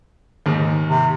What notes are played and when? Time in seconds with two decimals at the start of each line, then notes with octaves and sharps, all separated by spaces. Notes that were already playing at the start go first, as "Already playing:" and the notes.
0.46 D#2 G#2
0.88 C3